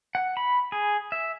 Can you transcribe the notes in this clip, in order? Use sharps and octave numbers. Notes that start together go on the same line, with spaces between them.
F#5
B5
G#4
E5